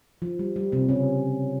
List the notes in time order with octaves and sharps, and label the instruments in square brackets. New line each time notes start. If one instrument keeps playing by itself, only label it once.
[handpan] F3
G3
G3
C3 C4
C#3 C#4